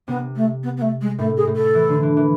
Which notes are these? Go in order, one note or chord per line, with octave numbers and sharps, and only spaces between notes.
C3 B3
A3
B3
B3
A3
G#3
A2 A3
G#4
A2
A4
E3
D3
E3
E3